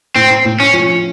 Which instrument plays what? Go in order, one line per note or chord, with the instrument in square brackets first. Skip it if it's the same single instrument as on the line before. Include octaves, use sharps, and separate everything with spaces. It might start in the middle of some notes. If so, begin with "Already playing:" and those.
[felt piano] A2 [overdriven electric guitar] C4
[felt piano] A2
[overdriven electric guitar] C#4
[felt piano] F3